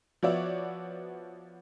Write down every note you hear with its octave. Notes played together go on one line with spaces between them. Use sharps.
F3 B3 F#4 C#5 D5 E5